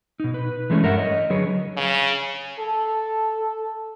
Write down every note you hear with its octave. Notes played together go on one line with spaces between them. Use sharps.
B2 D#4
B4
E3 G#3 A3 C#4
G2 A3 A#4 E5 F#5
C#5 D#5
D3 F#3 G#4 B4 C#5
C#3
A4